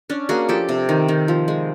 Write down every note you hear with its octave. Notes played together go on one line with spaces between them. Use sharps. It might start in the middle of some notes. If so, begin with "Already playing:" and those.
C#4 D4
A#3 F#4 G#4
F3 G4 A4
C3
D#3
D#3
F3
G#3